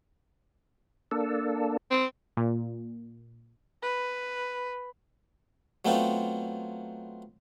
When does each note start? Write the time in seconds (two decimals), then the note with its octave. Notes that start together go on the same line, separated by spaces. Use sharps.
1.11 A#3 D4 A4
1.91 C4
2.37 A#2
3.82 B4
5.85 F#3 A3 B3 C4 D#4 F4